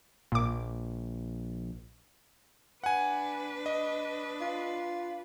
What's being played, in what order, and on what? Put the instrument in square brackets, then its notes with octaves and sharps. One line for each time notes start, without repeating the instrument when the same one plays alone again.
[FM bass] A#1 [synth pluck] A#2 D6
[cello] D4 B4 [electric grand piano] F#5 G#5
[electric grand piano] D#5
[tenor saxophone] F4